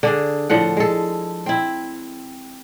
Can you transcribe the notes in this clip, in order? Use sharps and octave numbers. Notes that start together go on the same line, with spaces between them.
D3 D4 G#4
A2 D3 F3 F#5
G#3 A4
C4 E4